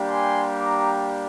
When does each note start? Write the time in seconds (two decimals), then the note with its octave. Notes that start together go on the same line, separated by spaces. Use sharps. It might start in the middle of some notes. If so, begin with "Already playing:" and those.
Already playing: G3 A#3 D4 G4
0.10 G#5 C6
0.56 A#5 D6